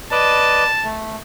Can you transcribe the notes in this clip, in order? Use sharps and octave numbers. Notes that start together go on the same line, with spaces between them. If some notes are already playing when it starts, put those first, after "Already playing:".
B4 D5 D#5 A5
A3